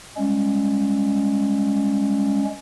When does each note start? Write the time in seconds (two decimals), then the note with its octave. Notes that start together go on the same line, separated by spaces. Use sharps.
0.16 G3 G#3 C#4